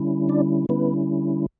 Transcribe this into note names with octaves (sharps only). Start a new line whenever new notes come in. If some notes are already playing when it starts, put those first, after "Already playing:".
Already playing: D3 G3 C#4 E4
D4 D5
D3 G3 B3 C#4 E4 B4